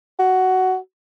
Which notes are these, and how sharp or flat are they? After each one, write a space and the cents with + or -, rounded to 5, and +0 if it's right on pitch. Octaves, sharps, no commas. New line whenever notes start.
F#4 +10